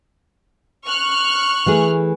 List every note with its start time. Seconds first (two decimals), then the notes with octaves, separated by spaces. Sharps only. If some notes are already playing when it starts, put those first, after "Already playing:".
0.86 C#6 F6 F#6
1.66 E3 A3 G#4